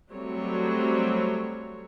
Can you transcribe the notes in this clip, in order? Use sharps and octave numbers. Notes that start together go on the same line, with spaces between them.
F#3 G3 A3 C4 C#5